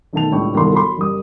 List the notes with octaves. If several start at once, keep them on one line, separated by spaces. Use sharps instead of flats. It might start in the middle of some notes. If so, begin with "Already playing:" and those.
B1 D#3 A3 A5 F7
C#2 A2 G3 D4 G5 C#6
G1 C2 D#3 A4 C6
F#3 B5 C6
F#1 G3 D#6